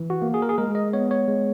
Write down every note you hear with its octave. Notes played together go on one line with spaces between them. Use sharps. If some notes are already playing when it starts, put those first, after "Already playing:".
Already playing: E3
F#4
A#3
G#4
A#4
G#4
G#3 A#4
D#5
B3 C#5
C#5
G#3